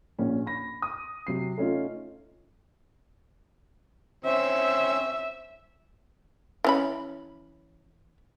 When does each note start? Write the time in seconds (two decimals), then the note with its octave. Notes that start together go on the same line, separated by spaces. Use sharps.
0.19 A#1 A#2 C#4
0.46 B5 A#6
0.82 D#6
1.27 C3 F#3 C7
1.58 A3 C#4 D#4 F4
4.25 C4 C#4 E5
6.64 E3 C#4 B5